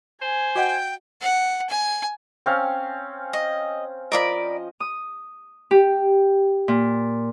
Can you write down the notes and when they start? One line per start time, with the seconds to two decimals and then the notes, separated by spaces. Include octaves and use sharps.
0.22 C5 G#5
0.55 F#4 D#5 F#5 G5
1.21 F#5
1.69 G#5
2.46 C4 C#4 F5
3.33 D#5
4.12 F3 A#4 D5 D#5 B5
4.80 D#6
5.71 G4
6.68 A#2